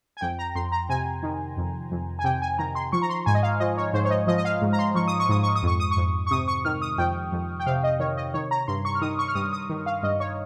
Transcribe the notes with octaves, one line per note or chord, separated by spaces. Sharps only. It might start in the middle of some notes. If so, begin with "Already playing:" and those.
G#5
F2 G5
A#5
F2 C6
A#5
C3 G#5
D#3
F2
F2
G#5
C3 G5
G#5
D#3 A#5
C6
F3 C#6
A#5
C6
G#2 G#5
D#5
F5
F3 D#5
C#5
G#2 C5
C#5
D#5
F3 D#5
D#5
F5
G#2
A#5
C6
F3 C#6
D#6
C#6
G#2 D#6
C#6
D#6
F2 C#6
D#6
C#6
F2
C#6
C3 D#6
C#6
D#3 F6
D#6
F2 G5
F2
G5
C3 F5
D#5
D#3 C#5
D#5
D#3 C#5
A#5
G2 C6
C#6
F6
D#3 D#6
C#6
F6
G2 D#6
D#6
D#3
F5
G2 D#5
C#5